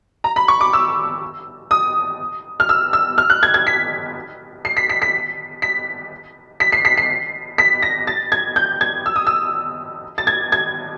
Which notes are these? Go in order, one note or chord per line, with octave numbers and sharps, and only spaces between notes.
A#5
B5
C#6
D6
E6
D#6
F6
E6
E6
F6
F#6
G#6
G#6
B6
C7
B6
B6
B6
B6
B6
C7
B6
C7
B6
A#6
A6
G#6
G6
G#6
E6
D#6
E6
A6
G#6
G#6